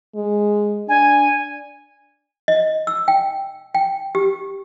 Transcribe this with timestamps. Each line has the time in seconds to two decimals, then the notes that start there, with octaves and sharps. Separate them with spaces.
0.16 G#3
0.89 D4 G#5
2.48 D#5
2.87 E6
3.08 G5
3.75 G5
4.15 G4